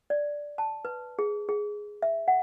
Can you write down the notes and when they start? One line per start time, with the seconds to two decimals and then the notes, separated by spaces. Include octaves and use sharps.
0.10 D5
0.58 A5
0.85 B4
1.19 G#4
1.49 G#4
2.02 E5
2.28 F#5